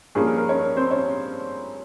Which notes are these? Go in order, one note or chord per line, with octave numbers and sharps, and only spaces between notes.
G2 F3 A#3 C#4 G#4
A#4
A#4
C#4 C#5
A#4
C4 C5
C#4 C#5